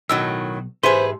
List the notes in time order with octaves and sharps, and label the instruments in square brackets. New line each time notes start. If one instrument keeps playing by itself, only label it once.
[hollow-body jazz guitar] B1 [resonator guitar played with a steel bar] A2 D#3 F#3 [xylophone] E6
[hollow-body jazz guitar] G#2 G4 E5 [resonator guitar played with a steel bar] G#4 B4 [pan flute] C5 [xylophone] C6